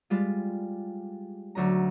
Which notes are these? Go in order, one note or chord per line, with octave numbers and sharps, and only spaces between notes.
G3 G#3 F4
D2 F#3 C#4 A#5